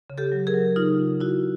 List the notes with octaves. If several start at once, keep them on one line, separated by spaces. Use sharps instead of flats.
C#3
G4 A4
F#3
G#4 A#4
F#3
C#3 D#4 F4
C#3
C#3 E4 F#4